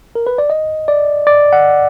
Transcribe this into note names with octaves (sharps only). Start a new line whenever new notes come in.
A#4
B4
D5
D#5
D5
D5
F#5